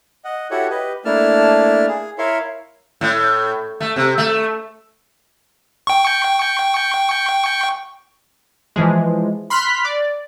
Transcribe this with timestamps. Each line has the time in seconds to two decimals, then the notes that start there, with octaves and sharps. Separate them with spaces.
0.25 D#5 F#5
0.51 E4 F#4 G4 A4 C#5 F#5
0.70 G4 B4 D#5
1.05 A3 A#3 D4 E4 A5 F6
1.88 G#4
2.18 E4 A#4 C#5 E5 F5 C6
3.01 A2
3.80 A3
3.96 C3
4.18 A3
5.87 G5 C#6
8.76 E3 F3 G#3
9.50 B5 C6 F6 F#6 B6
9.85 D5